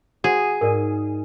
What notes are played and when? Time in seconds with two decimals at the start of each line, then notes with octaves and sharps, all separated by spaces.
0.24 F#4 G#4 C5 F#5
0.61 G#2 A#4 D5